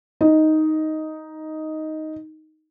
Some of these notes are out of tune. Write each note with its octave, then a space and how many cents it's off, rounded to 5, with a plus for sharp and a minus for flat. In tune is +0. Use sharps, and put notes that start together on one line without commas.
D#4 +5